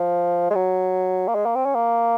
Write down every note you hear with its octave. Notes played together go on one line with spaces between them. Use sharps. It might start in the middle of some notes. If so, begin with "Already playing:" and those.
Already playing: F3
G#3
F#3
A#3
G#3
A#3
C4
C#4
A#3